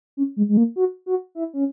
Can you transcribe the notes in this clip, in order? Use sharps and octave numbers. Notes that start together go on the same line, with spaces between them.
C#4
G#3
G#3
A#3
F#4
F#4
E4
C#4